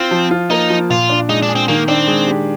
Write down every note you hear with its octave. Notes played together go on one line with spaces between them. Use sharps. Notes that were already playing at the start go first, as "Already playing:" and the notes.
Already playing: C4 F4
F3
F4
A#3 D#4
F3
A#2 F4
D4
G#3 D#4
D4
G#4
C4
D#3 A#3
C4 D4
G#3
G4